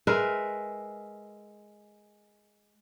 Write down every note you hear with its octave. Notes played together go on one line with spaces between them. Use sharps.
G#3 A#4 B4 E5